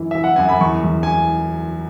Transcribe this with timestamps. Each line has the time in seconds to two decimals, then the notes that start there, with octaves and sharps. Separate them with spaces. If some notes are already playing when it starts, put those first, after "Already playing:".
Already playing: F#2 E3
0.11 E3 E5
0.24 F#5
0.36 F#2 G#5
0.49 B5
0.61 E2 C#6
0.84 E2
1.03 G#5